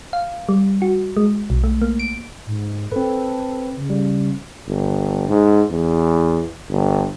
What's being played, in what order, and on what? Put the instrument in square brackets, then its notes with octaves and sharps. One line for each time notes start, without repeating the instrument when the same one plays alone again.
[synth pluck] F5
G3
F#4
G#3
B1
A3
A#3
D7
[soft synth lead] G#2
[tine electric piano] C4 B4 [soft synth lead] A4
[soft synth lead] C#3
[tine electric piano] G3
[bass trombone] G1
G#2
E2
G1